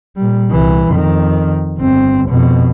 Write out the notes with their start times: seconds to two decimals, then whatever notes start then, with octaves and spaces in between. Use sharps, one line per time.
0.16 A#2 G3
0.51 C2 E3
0.90 F2 D#3
1.77 G1 C4
2.29 F2 B2